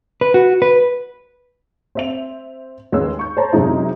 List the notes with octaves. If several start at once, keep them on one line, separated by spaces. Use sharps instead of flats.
B4
F#4
B4
C4 E5 F7
D#2 G#3 C#4 B4 E6
C#6 G6
C5 C#5 A5 A#5
F#2 C3 G#3 D#4 E4